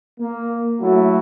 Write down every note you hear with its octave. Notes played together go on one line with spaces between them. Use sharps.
A#3
F#3 A3 E4 F#4